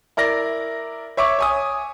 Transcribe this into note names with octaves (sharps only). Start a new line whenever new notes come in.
E4 A#4 D5 A#6
C#5 E5 C#6 D6
C#5 G#5 D#6